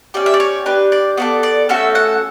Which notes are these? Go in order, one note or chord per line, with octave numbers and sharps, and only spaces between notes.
C#4 G4 D5
E5
D5
C#5
D4 G4 B4
D5
B3 F#4 A4 D5
D5
A3 C#4 F#4 A4 E5
F#5